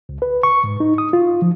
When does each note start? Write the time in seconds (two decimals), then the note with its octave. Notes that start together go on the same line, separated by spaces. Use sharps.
0.09 C#2
0.22 B4
0.43 C#6
0.64 G#2
0.80 D#4
0.98 D#6
1.13 F4
1.42 F3